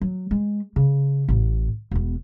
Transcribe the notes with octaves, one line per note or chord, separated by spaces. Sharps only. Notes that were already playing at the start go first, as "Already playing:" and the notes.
F#3
G#3
C#3
A1 A2
E1 B3